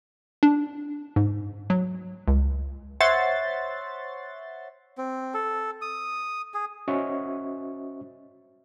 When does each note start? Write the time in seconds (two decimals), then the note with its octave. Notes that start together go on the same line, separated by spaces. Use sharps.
0.43 D4
1.16 G#2
1.70 F#3
2.28 C#2
3.01 C5 C#5 E5 F#5 C6 A6
4.98 C4
5.34 A4
5.82 D#6
6.54 G#4
6.88 C#4 F#4 C5 D#5 E5 C#6